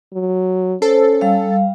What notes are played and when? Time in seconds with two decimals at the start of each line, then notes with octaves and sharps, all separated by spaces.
0.13 F#3
0.82 C#4 A4 C5
1.21 G3 F5